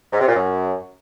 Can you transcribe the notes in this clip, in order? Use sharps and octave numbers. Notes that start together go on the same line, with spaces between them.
G#2
C3
A#2
F#2